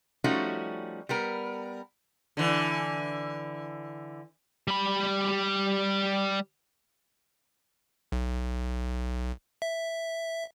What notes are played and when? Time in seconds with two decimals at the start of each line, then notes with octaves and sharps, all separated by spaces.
0.24 F3 G3 A3 C#4 D#4 F#4
1.09 G3 B3 A#4
2.37 D3 E3
4.68 G3 B5
8.12 B1
9.62 E5